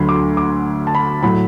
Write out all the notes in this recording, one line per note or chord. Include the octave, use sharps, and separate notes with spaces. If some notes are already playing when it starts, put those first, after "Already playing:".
Already playing: D2 D3 F#3 B5 C6
D6
D6
A5
B5
A2 F#3 B5